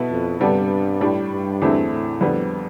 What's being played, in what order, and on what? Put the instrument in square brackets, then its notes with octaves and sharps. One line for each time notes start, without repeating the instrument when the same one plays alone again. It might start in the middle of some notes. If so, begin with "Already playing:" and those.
Already playing: [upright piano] B2 B3 E4 A4
[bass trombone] F2
[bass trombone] G2 [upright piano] C3 G3 B3 D4 A4
[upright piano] A2 G3 D4
[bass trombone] G2
[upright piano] E2 D3 A3 C4 E4
[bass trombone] A2
[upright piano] F2 D3 G3 B3